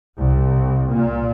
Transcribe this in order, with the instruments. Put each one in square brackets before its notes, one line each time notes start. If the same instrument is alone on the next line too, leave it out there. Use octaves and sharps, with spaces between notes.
[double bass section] C2
A#2